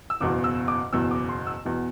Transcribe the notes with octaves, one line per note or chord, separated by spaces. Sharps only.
E6
F#1 E2 B2 D6
E6
D6
F#1 E2 B2 E6
D6
C6
E6
E2 B2